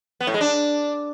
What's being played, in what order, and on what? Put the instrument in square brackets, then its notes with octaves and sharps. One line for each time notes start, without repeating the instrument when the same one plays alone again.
[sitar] B3
A2
G#3
D4